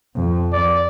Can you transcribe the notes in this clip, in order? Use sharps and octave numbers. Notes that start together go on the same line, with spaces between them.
F2
D5